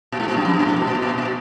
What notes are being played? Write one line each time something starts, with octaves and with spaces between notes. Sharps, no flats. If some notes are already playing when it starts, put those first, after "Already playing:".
A#2
G#2
A#2
F#2
F2
F#2
A#2
G#2
B2
A#2
B2
A#2
B2
A#2
B2